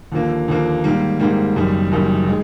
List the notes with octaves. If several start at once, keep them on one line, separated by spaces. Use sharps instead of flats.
D#2 D3 F3 A#3
D#2 D3 F3 A#3
G#2 D#3 G3 A#3
G#2 D#3 G3 A#3
F#1 F#2 D#3 G3
F#1 F#2 D#3 G3
D#3 G#3